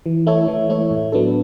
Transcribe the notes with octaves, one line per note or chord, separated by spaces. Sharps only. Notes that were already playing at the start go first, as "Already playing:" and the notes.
E3
A3 E4 A4 C#5
E3
A3 E4 A4 C#5
A2
F#3 B3 D4 A4